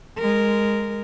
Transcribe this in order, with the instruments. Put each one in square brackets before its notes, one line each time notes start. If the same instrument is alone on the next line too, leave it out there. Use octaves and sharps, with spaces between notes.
[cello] G#3 A#4